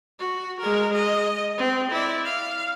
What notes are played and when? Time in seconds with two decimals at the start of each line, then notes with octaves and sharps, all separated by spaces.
0.19 F#4
0.60 G#3 A#4
0.93 D#5
1.58 C4
1.91 E4 D5
2.25 F5